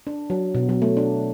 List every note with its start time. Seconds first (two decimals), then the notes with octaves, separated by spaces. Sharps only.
0.07 D4
0.30 F#3
0.55 B2
0.69 F#3
0.82 A3
0.97 D4